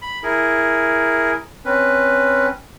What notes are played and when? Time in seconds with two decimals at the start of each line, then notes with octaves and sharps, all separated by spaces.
0.02 B5
0.23 E4 G#4 A#4
1.65 C4 C#4 B4